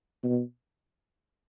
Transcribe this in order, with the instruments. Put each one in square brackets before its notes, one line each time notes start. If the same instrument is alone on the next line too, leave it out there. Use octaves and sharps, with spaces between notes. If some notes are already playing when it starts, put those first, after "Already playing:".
[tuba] B2